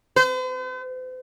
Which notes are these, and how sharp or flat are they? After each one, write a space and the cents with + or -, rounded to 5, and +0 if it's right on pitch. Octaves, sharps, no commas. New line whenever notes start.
C5 -45